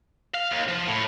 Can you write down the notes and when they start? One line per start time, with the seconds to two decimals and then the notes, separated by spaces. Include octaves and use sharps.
0.34 F5
0.51 D#2
0.68 F3
0.87 A2